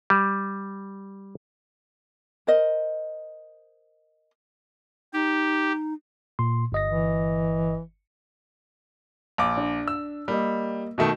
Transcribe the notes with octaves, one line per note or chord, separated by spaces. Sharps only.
G3
A#4 C5 D#5
D#4 G4
A#2 C6
G1 D#5 A#6
E3
A#1 D6
D4
E6
G3 A#3 D#5
B2 D#3 A3 F#4 E7